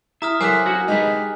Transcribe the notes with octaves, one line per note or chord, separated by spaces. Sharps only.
E4 E5 A#5 D#6 F6
F#3 A4 A#4 C5 E5 G#5 D6 F#6
D4 F#4 F5 F#5
G#3 D#4 G4 B4 D#5